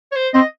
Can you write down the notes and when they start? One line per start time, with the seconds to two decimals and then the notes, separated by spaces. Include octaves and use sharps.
0.12 C#5
0.16 C5
0.34 C4 D#5